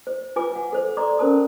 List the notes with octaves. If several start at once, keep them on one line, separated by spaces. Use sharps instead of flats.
C5
F4 B4 G#5 D6
F#5
A4 C5
A4 D5 A#5 C6 D6
C#4 A#4 C5 A5 D#6